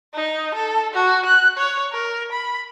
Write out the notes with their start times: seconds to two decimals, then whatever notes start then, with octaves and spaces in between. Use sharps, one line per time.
0.14 D#4
0.55 A4
0.94 F#4
1.25 F#6
1.57 C#5
1.92 A#4
2.32 B5